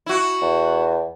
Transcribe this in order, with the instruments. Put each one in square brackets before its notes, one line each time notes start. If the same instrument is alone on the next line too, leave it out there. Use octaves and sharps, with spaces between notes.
[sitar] E4 F#4
[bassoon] E2